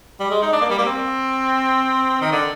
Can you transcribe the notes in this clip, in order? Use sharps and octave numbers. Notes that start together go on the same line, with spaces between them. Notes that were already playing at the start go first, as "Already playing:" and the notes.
G3
G#3
D#4
D4
A#3
G3
A#3
C4
D#3
D3